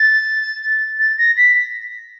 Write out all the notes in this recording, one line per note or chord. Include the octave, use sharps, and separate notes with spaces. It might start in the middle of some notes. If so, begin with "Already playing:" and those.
Already playing: A6
A6
A#6
B6